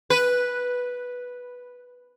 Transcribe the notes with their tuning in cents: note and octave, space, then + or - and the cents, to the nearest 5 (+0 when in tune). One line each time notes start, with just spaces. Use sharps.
B4 -5